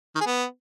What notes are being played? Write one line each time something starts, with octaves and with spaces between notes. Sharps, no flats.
D#3
G#4
B3